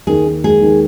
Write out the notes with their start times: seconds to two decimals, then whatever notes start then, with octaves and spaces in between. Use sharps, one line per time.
0.07 D#2 G#4
0.25 D#2
0.44 G#3 G#4
0.61 D#2